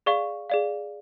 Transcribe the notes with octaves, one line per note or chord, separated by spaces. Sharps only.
G#4 D5 F5 C#6
G#4 D5 F5